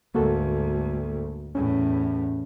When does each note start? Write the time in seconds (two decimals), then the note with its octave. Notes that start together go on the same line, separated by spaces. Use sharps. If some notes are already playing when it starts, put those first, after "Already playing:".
0.15 D2 G#2 A#3 F#4 A4
1.55 E2 A2 C#4